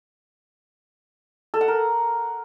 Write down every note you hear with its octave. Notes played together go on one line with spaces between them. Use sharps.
A4
F#5
A#4